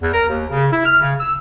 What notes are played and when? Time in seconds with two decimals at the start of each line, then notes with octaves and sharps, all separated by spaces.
0.02 E2
0.14 A#4
0.29 D#2
0.50 C#3
0.73 E4
0.86 F6
1.01 C#3
1.19 E6